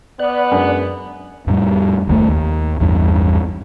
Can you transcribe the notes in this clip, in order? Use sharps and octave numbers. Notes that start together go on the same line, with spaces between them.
B3 D5 F#6
F#2 G#3 D4
F2 A2 G3
F#1 D#2 C#3 A3
D#2
A1 E2 G2